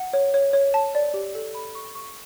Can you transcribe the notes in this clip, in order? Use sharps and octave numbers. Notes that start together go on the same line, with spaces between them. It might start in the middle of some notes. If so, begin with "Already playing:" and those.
Already playing: F#5
C#5
C#5
C#5
A5
D5
G4
A4
B5
C#6
C#6